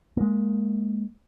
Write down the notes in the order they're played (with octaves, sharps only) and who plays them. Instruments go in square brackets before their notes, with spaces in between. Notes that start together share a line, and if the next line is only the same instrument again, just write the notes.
[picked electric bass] G#3 A#3